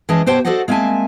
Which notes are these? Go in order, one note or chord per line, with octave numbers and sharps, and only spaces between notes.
E3 G#3 C#4 G#4 D#5 A5
B2 G4 C5 C#5 G5 A5
F#4 A4 C5 D5 D#5 F#5
G#3 A#3 C4 E5 G#5 A5